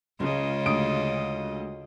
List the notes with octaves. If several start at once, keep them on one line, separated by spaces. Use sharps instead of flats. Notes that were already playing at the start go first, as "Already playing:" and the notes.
C#2 C#3 G#3 C#4 F4 D#5
D2 D#6 D7